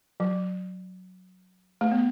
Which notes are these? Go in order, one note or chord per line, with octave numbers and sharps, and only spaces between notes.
F#3
A3
B3